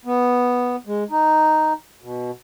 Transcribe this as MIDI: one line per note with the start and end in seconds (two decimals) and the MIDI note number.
0.05 0.76 59
0.87 1.04 56
1.10 1.73 63
2.02 2.31 47